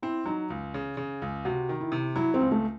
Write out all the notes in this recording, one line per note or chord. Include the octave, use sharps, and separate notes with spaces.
C4 E4
F#3 D#4
C#2
C#3
C#3
C#2
C3 F#4
D#3
E4
C3
F#3 E4
C4
C#2
A3